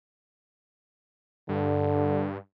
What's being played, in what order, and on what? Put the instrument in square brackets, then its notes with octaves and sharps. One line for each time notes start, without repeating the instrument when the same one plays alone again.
[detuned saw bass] G2 [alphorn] D3